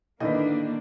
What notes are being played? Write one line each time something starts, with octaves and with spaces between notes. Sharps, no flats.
A2 D3 D#3 A#3 D4 B4 D#5